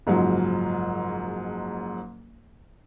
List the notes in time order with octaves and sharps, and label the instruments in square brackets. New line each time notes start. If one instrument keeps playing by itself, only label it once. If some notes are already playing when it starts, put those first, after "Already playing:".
[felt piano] F#1 G#2 F3 F#3